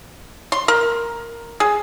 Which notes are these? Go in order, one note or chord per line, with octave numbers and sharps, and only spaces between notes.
C6
A#4
G#4